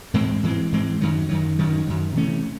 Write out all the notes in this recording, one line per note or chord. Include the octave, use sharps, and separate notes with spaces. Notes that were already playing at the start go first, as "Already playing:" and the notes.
G#2 E3 G#3 C4
G#2 E3 G#3 C4
G#2 E3 G#3 C4
F#2 D#3 F#3
F#2 D#3 F#3
F#2 D#3 F#3
F#2 D#3 F#3
C3 E3 A3 C#4